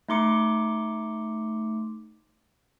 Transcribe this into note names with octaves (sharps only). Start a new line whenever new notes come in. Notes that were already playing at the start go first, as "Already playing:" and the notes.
A3 D#4 C6 D6 C#7